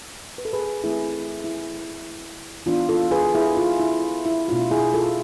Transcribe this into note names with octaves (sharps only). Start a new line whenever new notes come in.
B4
A4
G#4 B4
E3 A3 C4 E4 G#4
E4
E3 B3 D4 F4
F4 A4
G#4 B4
E4 G#4
F4
E4
E4
B2 A3 D4 F4
E4 G#4
F4 A4